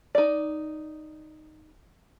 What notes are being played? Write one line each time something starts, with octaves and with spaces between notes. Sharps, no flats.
D#4 D5